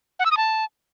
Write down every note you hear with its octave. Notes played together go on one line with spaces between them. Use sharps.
F#5
E6
D#6
A5